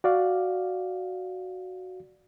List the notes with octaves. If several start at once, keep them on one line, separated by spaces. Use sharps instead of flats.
F#4 D5 F5